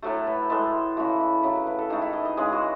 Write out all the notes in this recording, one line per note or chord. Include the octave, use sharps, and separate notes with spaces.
A2 F#3 A3 A4
B4
A2 G#3 A4
C#3 E3 A3 F#4
E4
C#3 F#3 A3 E4
B4
B4
A4
D#3 A3 G#4
E4
D#5
D#5
C#3 E3 G#3 G#4
F#4